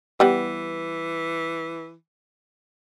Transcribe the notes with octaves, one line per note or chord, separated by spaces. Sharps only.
E3 G3 B3